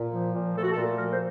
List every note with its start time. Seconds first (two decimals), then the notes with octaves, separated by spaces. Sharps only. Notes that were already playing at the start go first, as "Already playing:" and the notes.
Already playing: A#2
0.12 F3
0.34 A#2
0.55 A3 A4
0.62 F#4
0.71 A4
0.75 A#2
0.97 F3 A#4
1.12 C5